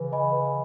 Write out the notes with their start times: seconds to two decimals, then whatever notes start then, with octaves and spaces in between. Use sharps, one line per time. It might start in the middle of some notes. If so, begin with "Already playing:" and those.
Already playing: C#3 E3 B4
0.12 D#5 G#5 B5
0.32 B4